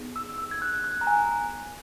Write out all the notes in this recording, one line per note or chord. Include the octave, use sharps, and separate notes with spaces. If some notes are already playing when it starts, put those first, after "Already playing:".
Already playing: B3 D#4 G#4
E6
E6
G#6
F#6
F#6
A#5
G#5